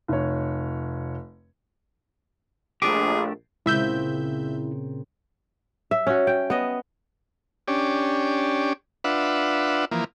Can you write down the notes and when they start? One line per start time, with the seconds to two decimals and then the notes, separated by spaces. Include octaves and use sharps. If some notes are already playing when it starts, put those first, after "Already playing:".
0.08 F1 C#5
2.82 A#1 A3 D4 G4 G#4 D6
3.66 C#2 A#2 C#3 C4 E4 E5 G6
5.91 E5
6.07 C#4 F#4
6.27 G5
6.50 B3 D#5
7.68 C#4 D4 G4
9.04 D4 F4 B4 E5 F#5
9.91 E3 F3 A#3